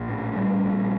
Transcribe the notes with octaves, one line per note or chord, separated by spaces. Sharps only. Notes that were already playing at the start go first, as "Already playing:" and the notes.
Already playing: A#1
A2
G3
A#1